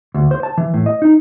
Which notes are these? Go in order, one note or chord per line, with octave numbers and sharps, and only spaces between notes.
D2
C5
A5
E3
A2
D#5
D#4